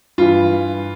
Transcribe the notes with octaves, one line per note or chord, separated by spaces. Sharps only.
G2 E3 F4